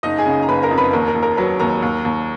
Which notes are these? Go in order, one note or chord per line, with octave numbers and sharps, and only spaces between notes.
F#1 D#4 D#5
G#4 G#5
C#3
A#5
F#1 B4 B5
A#4 A#5
F2
B4 B5
D#2 A#4 A#5
A#4 A#5
D#2
A#4 A#5
F#3 B4 B5
D#2 A#4 A#5
D#2
D#2